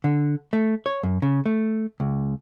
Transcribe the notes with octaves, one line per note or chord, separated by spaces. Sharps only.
D3
A3
C#5
F#2
C#3
A3
C#2